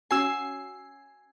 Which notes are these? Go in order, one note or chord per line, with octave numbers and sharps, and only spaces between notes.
C#4 F#4 G#5 E6 C7